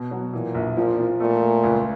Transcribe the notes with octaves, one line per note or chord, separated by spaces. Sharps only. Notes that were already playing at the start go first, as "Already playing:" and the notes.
Already playing: B2
F#3
A#2 E3
A#1
A#2 F3
F3
A#2 A3
A3
C#2